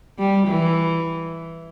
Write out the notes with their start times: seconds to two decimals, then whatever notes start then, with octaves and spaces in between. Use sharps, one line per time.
0.19 G3
0.47 E3